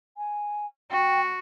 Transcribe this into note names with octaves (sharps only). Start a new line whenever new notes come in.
G#5
F#4 G5